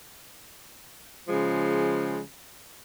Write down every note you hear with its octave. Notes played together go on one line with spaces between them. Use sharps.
C#3 F3 G#3